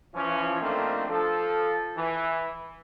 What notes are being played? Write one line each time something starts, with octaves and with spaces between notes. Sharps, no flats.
E3 F3 C#4
D#3 F3 A3 A#3 C4 D4
F3 A4
E3